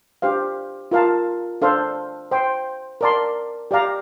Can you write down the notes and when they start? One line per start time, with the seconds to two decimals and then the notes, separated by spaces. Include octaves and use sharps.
0.22 D4 G4 C5 F5
0.91 F4 A#4 F5 A5
1.62 D4 A4 C5 F5 C6
2.31 C5 G5 C6
3.01 A#4 D5 A5 C6
3.71 G4 D5 F5 A#5